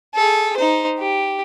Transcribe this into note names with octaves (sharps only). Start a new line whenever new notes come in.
G#4 A4
D#4 C5
G4